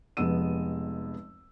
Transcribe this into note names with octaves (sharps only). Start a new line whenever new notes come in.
F1 F2 G#3 B3 E6 D#7